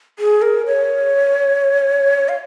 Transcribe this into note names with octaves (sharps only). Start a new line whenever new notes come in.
G#4
A#4
C#5
F5